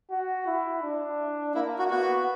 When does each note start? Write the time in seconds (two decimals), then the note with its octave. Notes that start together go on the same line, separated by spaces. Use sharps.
0.10 F#4
0.46 E4
0.83 D4
1.55 A#3 E4
1.79 F#4
1.90 B3 F#4